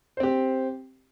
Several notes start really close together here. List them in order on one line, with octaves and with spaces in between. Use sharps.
C5 C4 G4